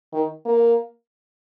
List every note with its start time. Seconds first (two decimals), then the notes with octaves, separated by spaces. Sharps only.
0.13 D#3
0.46 A#3